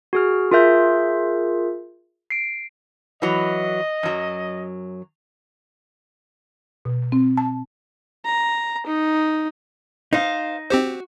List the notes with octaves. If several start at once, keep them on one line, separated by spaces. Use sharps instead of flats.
F#4 G#4 F6
F4 G#4 A#4 E5 G6
C7 D7
E3 F#3 D#5
F#2 F#3
B2
C4
A5
A#5
D#4
D#4 C5 F5
C4 F#4 G4 C5